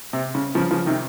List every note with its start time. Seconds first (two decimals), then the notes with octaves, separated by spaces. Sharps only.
0.13 C3
0.35 C#3
0.55 C#3 F3
0.71 C#3 F3
0.86 C3 D#3